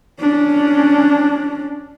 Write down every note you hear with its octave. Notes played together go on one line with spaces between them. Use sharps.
C#4 D4